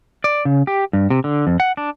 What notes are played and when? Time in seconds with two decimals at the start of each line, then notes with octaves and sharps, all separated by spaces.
0.24 D5
0.45 C#3
0.67 G4
0.93 G2
1.10 C3
1.24 D3
1.47 F2
1.60 F#5
1.77 D4